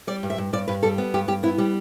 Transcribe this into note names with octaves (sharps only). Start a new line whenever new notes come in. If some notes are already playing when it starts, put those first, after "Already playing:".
G3 D5
G2
E5
G2
G2 D5
G2 B4
G3 A4
B3
G2 G4
G2 G4
B3 E4
G3 G4